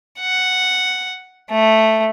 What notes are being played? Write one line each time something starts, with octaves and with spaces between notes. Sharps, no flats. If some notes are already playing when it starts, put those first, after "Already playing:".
F#5
A3